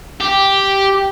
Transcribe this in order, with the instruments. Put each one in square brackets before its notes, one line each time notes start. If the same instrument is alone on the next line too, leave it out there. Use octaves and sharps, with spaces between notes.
[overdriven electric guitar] G4